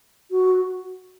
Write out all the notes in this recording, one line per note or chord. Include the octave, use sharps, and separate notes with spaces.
F#4